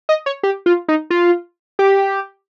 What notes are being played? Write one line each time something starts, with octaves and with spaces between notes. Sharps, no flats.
D#5
C#5
G4
F4
D#4
F4
G4